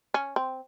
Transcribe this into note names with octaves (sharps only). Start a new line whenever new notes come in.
C#4
C4